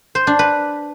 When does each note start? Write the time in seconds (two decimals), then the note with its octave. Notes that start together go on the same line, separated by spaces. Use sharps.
0.15 C5
0.27 D4
0.39 B4